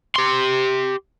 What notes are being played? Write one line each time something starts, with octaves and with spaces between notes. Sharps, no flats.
G4 C6